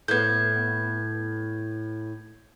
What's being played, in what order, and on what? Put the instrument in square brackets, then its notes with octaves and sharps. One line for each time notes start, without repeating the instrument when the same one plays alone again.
[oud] A2 B3 [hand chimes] G6 G#6